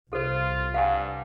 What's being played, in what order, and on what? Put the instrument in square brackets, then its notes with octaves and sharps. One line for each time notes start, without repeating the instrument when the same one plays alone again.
[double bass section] C2 [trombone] F4 [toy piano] A4 C5
[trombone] G2 [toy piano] F5 F#5 G#5